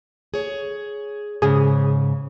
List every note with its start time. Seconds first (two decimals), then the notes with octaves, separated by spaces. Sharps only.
0.34 G#4 C#5
1.42 G#2 C#3 G#4